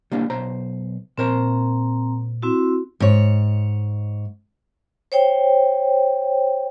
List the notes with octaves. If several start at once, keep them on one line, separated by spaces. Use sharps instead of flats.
G3 A#3 D4
B1 C5 A#5
A#2 C4 A#4 C5 A#5
C4 E4 F#4
G#2 C#5
C5 C#5 G5